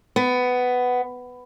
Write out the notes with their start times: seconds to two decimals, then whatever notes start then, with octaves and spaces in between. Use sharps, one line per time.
0.16 B3